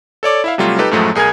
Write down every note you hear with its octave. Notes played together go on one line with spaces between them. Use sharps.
A4 C#5 D5 D6
E4 E5 F5
C3 F#3 G3 A3 F4
D#4 G4 A4 B4
F#2 A2 F3 F#3 G#3 A3
B1 G#4 A#4 G#5 G#6